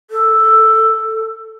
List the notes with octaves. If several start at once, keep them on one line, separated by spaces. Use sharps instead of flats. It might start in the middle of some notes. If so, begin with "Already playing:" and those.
A4